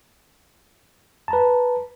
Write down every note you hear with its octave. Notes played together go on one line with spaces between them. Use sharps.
B4 A5 A#5